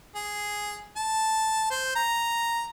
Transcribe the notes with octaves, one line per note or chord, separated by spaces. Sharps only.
G#4
A5
C5
A#5